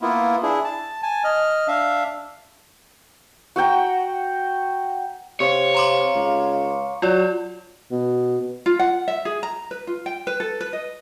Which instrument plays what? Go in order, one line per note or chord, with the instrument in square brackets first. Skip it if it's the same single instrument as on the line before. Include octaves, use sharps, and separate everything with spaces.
[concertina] A#3 B3 E4 F4
D4 E4 G#4
A5
G#5 A5
D#5 F6
D4 E5 F5
[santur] F#4 F#5 G5 A#5
[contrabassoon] C3 [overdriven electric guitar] C#5 [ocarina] F5
[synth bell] A#5 C6 D6
[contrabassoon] C#2
[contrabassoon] F#3 [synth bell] F4 D5
[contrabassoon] B2
[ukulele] F4
F#5
E5
G#4
A#5
B4
F4
G5
B4
A4
B4
D#5